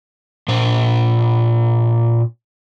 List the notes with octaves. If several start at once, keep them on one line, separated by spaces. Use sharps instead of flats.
A#2 C5